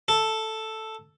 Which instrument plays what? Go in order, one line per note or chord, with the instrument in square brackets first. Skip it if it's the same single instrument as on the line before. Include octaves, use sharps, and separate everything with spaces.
[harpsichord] A4